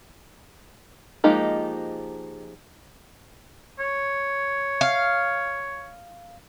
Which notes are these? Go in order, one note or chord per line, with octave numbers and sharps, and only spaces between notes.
F3 G#3 A#3 D#4 G4
C#5
F5